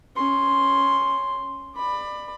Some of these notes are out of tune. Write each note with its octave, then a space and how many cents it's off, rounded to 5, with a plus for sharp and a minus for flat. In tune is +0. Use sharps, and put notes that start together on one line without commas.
C#4 +0 C6 +0
D5 +30 B5 +10